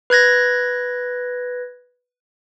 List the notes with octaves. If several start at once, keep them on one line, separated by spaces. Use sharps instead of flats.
B4 F#6 G#6 A#6